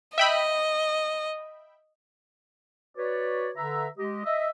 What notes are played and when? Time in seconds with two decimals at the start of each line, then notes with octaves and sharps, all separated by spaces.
0.18 D#5 E5 G5 B5
2.97 F#4 B4 C#5 D5
3.57 D3 B4 E5 A#5
3.98 G#3 G4 D#5
4.25 D#5 E5